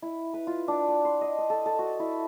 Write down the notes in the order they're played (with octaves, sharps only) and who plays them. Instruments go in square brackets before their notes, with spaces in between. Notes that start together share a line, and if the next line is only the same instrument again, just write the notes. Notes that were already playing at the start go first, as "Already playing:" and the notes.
[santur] E4
B4
F4
D4
F#5
C6
D#5
D#6
A4
A4
F#4
E4